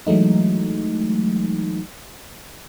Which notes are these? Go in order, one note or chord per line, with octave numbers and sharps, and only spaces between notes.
E3 F#3 G#3 A3 D#4